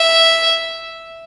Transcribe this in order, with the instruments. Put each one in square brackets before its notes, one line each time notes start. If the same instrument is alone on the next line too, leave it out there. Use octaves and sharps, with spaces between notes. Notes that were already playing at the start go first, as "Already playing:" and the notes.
Already playing: [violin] E5